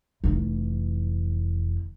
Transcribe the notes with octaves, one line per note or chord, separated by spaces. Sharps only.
F1 E3